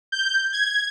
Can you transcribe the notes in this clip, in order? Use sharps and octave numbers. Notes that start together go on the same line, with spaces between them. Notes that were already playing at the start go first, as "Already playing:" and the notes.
G6
G#6